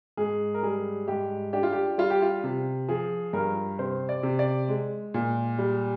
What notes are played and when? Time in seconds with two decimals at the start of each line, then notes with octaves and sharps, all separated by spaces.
0.17 G#2 G#4
0.54 A#4
0.63 G3 G#4
1.08 G#2 G4
1.53 D4 G4
1.63 F4
1.72 G4
1.98 G3 F4
2.10 G4
2.22 F4
2.44 C3
2.89 F3 G#4
3.33 G2 A#4
3.79 C3 C5
4.09 D5
4.23 C3
4.39 D5
4.69 G#3
5.14 A#2
5.59 G3